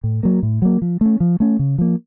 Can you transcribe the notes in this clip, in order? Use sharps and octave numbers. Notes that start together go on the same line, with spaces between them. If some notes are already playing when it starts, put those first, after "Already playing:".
A2
F#3 A#3
A2
F#3 A#3
F3
A3 C#4
F3
A3 C#4
C#3
F3 A#3